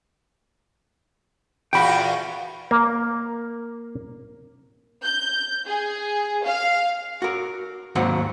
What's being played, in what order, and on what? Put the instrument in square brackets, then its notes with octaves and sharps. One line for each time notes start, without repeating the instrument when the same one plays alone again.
[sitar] E2 A#2 F#4 [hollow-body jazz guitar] G5 B5
[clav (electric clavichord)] A#3
[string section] G6
G#4
F5
[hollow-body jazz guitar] F#4 A#4
D#2 G#2 F#3 C4 F#5